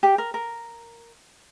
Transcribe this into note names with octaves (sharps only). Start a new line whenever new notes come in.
G4
A#4
A#4